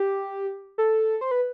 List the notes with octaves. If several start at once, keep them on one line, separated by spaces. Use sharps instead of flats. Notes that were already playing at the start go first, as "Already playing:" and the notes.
Already playing: G4
A4
C5
B4